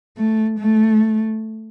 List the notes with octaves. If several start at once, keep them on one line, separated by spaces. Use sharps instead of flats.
A3
A3